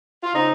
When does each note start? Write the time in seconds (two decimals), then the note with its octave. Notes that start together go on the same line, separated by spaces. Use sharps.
0.23 F4
0.34 C#3 C4 D#4